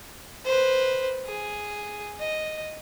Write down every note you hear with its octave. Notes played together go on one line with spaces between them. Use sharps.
B4 C5
G#4
D#5